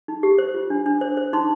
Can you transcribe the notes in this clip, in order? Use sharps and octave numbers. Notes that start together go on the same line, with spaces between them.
D#4
G4
C5
F4
D4
D4
C5
C5
D#4 C6